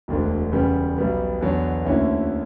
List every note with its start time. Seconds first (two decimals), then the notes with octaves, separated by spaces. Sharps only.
0.08 E1 D2 D3
0.52 E2 C#3 G3 B3
0.96 B1 B2 G3 B3
1.41 E2 D3 F#3 B3 D4
1.85 D2 D3 A#3 C#4 E4